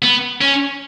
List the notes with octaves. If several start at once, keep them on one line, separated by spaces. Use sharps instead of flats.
B3
C#4